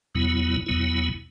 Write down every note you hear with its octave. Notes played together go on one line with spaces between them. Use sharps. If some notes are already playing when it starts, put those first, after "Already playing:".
E2 B2 F#3 B3 E4
E2 B2 F#3 B3 E4